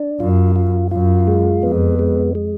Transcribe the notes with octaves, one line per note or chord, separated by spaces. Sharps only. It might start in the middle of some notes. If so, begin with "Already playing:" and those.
Already playing: D4
F#2 F4
F4
F#2 F4
G#3
F2 B3
G#3
G#3